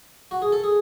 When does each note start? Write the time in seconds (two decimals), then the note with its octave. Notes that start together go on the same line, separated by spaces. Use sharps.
0.31 F#4
0.42 G#4
0.52 A4
0.64 G#4